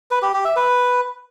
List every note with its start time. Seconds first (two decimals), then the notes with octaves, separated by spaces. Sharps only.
0.11 B4
0.22 G4
0.33 G4
0.45 E5
0.56 B4